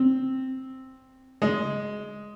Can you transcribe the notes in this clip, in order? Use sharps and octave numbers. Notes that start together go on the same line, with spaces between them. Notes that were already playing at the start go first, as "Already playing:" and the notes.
Already playing: C4
G#3